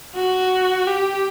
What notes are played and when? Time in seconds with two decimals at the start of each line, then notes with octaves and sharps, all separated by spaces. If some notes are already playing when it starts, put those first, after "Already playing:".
0.15 F#4
0.88 G4